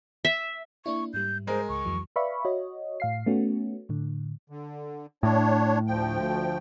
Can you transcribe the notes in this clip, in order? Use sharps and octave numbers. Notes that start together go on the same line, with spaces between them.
E5
A#3 D4 E4 C#6
G#2 G3 G6
G#3 A#4 C5
C#2 C#6
F2 E3 F#3
B4 D5 E5 F5 B5 C#6
F#4 C#5 D#5
A2 F5 C7
A3 B3 C#4 F#4
A2 D3
D3
A2 D4 C#5
D2 F3 G5